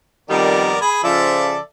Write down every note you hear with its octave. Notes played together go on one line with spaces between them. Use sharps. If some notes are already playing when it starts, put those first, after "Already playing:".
F2 D#3 G3 B3 A#4 D5
G#4 B5
C#3 F3 A4 D5 E5